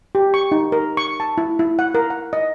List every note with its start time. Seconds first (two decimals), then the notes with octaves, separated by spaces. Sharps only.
0.15 G4
0.34 C#6
0.52 D#4
0.72 A#4
0.97 C#6
1.20 A5
1.38 E4
1.59 E4
1.79 F#5
1.95 A#4
2.10 F#5
2.33 D#5